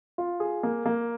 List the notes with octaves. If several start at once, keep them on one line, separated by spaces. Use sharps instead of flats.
F4
G#4
A#3
A#3